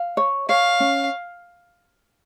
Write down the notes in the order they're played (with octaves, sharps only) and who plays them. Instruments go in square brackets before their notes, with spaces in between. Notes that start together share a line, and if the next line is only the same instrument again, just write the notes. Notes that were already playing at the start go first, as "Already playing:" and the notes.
Already playing: [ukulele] F5
C#5
[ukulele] C#5 [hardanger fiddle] F5
[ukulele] C#4